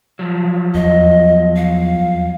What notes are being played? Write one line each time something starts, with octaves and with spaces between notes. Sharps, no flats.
F3 F#3
E2 D#5
F5